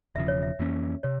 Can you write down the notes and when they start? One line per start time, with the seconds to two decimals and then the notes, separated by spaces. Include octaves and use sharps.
0.15 E1 E2 C#3 F3 E5
0.28 C#5
0.43 E5
0.59 F2 E3 A#3 C#4
1.03 C3 C#5